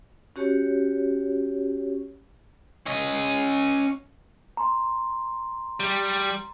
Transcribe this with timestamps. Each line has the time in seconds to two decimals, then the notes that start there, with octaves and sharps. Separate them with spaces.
0.36 C#4 F#4 G4 C#5
2.86 C#4 D#5
4.57 A#5 C6
5.80 G3